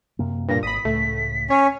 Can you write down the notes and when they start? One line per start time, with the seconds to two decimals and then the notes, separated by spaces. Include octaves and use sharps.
0.19 F#2 C3 A#3
0.49 G2 A#2 A#6
0.63 G#1 B5 D#6 B6
0.85 C#2 A2 A3
1.50 C#4 C#5